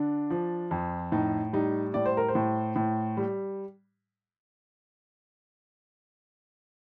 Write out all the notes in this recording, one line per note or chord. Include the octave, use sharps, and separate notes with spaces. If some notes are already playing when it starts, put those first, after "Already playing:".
Already playing: D3 D4
F3
F2
A2 D#4
G3 D#4
A2 D5
C5
A#4
C5
A2
A2
G3